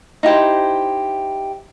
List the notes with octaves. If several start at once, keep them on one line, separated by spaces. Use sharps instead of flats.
D#4 E4 G4 C5